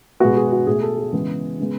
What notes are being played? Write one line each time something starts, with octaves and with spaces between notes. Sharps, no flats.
B2 G#3 B3 F#4
G#4
F#4
B2 A3 G#4
A4
G#4
C#3 E3 G#3 B3
C#3 G#3 B3